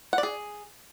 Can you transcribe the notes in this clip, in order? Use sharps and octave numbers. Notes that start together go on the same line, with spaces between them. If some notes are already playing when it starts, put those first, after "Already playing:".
F#5
D5
G#4